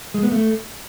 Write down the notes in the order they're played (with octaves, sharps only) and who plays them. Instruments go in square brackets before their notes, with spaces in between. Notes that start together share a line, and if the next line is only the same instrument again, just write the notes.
[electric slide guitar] G#3
B3
A3